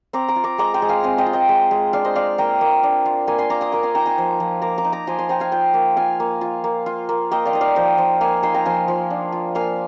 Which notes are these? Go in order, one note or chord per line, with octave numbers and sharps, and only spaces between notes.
C4 A#5 D6
A#5 D6
F4
A#5 D6
G#3 A#5 D6
G5 A#5
G#3
F5 G#5
C4 F5 G#5
D#5 G5
F4
D#5 G5
G#3
G#3
D4 D5 F5
C5 D#5
F4 D5 F5
A#3 G5 A#5
A#3
D4
F4
A#3 G#5 C6
G#5 C6
A#3 A#5 D6
C6 D#6
A#3 A#5 D6
G#5 C6
D#4 G5 A#5
G#5 C6
F3
F3
A#3 A#5 D6
A#5 D6
D#4
A#5 D6
F3 G#5 C6
G#5 C6
F3 G5 A#5
F5 G#5
F4 D#5 G5
A#3
F4 F5 G#5
A#3
F4
A#3
F4
A#3
A#3 D#5 G5
D5 F5
D#4 D#5
D5 F5
F3 D#5 G5
F3
A#3 F5 G#5
D#4 G#5 C6
G5 A#5
F3 F5 G#5
F3
D4
F4
A#3 F5 G#5